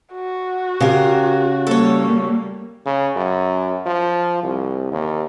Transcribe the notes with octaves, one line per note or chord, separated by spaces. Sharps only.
F#4
C#3 G4 A#4
G3 A#3 A4 C#5
C#3
F#2
F3
C2
D#2